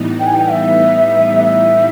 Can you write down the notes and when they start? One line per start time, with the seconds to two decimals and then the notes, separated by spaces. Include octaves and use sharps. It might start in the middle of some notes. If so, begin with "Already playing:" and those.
Already playing: A2 E3 G3 B3 D#4
0.20 G5
0.27 G#5
0.34 G5
0.51 E5
1.44 E5